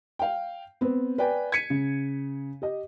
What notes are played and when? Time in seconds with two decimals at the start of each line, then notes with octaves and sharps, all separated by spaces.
0.19 F5 G5
0.81 B3 C4
1.18 B4 D5 G5 G#5
1.52 G#6 B6 C#7 D#7
1.70 C#3
2.62 G4 D#5